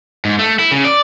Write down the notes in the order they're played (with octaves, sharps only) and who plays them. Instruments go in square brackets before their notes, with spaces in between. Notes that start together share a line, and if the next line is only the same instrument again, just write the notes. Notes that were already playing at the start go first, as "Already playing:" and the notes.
[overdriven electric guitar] G#2
A3
E4
C#3
D5